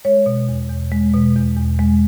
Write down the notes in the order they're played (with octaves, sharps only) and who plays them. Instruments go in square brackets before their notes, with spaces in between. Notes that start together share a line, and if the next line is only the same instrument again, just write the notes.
[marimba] G#3 C#5
B2
E2
E2
G#3
B2
E2
E2
G#3